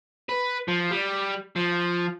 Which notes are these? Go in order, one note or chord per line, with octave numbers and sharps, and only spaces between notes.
B4
F3
G3
F3